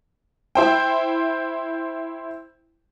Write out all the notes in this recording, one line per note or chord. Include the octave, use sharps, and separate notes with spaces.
E4 C5 G5